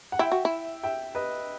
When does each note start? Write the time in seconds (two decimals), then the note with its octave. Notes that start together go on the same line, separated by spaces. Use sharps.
0.12 F#5
0.19 E4 E5 G5
0.32 F#4
0.45 E4
0.83 E5 G5
1.15 B4 D#5